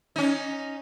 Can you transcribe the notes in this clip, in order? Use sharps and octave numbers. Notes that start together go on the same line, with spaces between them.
C#4 D#4